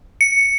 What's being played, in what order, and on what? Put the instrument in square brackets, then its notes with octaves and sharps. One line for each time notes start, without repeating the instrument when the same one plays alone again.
[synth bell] C#7